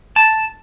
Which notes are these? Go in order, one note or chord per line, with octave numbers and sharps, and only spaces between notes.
A5